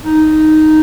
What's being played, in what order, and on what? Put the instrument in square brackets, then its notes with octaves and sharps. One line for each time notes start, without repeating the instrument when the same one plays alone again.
[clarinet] D#4